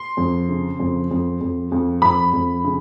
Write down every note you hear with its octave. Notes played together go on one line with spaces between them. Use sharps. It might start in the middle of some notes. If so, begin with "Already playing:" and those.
Already playing: C6
F2
C#3
F2
F2
F2
F2
F2 B5
F2
C#3